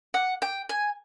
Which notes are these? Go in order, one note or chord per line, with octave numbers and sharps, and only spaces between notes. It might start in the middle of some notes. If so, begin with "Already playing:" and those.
F#5
G5
G#5